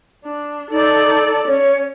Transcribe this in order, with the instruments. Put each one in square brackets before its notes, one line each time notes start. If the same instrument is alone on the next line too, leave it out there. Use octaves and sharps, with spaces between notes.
[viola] D4
[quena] D#4 [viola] A4 D5
[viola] C#4 [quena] C#5